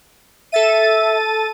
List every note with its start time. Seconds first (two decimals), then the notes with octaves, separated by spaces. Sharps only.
0.52 A4 E5 A6 D#7